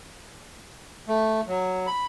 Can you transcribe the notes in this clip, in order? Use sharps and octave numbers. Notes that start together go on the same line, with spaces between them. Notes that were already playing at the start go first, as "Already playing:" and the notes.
A3
F#3
B5